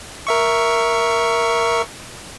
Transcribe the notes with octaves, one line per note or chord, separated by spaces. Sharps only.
A#4 E5 C#6